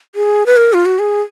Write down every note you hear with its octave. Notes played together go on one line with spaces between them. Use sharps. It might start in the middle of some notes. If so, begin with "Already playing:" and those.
G#4
B4
A#4
F4
F#4
G#4